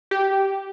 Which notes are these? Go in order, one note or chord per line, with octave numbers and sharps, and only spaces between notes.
G4